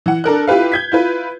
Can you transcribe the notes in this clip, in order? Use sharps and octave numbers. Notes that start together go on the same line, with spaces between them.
E3 F#5
D4 A4 A#4 F#6
E4 F4 G4 B4 F5
G6 G#6 B6
E4 F4 B4